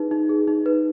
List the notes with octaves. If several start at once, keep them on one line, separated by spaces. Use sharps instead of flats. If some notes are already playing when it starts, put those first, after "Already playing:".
Already playing: D#4 G#4 B4
D#4
G#4
D#4
B4